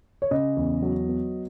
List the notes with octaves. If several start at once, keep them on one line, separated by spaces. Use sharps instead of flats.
C#5
C#3 D#5
E2
F#3
B3